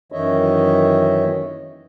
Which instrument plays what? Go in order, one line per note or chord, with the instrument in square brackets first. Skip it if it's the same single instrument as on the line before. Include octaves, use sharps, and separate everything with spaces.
[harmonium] F#2 D#3 E3 C#5 D#5 E5